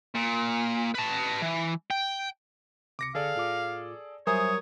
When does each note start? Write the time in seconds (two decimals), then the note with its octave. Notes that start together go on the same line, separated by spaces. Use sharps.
0.15 A#2
0.95 B4 A5
1.42 E3
1.91 G5
2.99 C#2 C3 D6 A#6 C#7
3.15 D3 G#4 A4 D5 F5
3.35 A2 F4 D6
4.27 F#3 G3 A#4 C5 C#5 E5 G#5 D#6